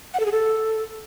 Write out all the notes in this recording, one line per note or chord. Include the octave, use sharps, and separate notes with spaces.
F#5
A4
G#4
A4